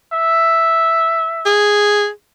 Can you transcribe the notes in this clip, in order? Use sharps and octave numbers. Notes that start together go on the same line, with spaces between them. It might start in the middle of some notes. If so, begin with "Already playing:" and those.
E5
G#4